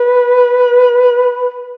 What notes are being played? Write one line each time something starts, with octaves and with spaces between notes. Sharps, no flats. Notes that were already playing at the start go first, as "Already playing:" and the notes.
Already playing: B4